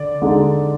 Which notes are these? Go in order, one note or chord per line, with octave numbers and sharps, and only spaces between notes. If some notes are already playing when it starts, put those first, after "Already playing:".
Already playing: D3 D5
D3 G#3 D#4